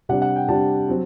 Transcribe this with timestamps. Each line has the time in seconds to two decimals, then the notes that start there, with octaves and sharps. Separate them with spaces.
0.09 C3 G3 D4 F#5
0.22 F#5
0.36 G5
0.48 C3 G3 D4 A5
0.88 F#3 C4